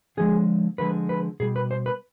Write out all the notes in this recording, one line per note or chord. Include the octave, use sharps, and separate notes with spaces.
D3 F3 G#3 G#4
D3 F3 G#3 B4
B4
B2 G3 G#4
B4
C5
B4